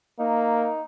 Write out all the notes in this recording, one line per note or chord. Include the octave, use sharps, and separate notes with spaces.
A#3 D#4